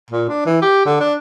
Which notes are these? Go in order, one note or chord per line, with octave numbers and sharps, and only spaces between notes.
A#2
D4
E3
G4
D3
D4